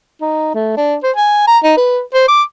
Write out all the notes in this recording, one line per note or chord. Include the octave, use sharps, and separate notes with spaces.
D#4
A3
D4
C5
G#5
A#5
D#4
B4
C5
D6